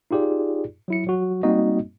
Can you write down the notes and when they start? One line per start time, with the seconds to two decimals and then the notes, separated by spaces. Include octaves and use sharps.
0.11 D#4 F4 G4 G#4 D5
0.88 F#3 E4 C#7
1.07 F#3 F#4
1.43 G3 A#3 C4 D#4 F#4 D#5